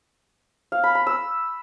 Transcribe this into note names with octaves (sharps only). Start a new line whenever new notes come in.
F5
B5
B5
E6